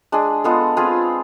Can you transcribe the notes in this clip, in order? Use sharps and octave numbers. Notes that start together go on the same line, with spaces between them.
G#3 D4 G#4
G#3 B3 F4 A4
C4 F4 G#4 B4